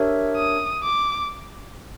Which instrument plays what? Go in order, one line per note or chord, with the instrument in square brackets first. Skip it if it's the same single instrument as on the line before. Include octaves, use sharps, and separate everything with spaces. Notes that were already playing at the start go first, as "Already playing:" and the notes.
Already playing: [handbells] D4 G4 A#4 C#5 E5
[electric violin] D#6
D6